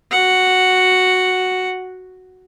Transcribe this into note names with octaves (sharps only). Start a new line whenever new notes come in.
F#4 F#5